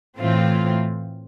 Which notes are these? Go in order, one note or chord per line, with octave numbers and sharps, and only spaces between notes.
A2 E3 A3 C4 F4